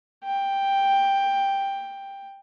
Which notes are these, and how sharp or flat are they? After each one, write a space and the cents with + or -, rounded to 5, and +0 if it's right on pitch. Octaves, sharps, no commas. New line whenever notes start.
G5 +5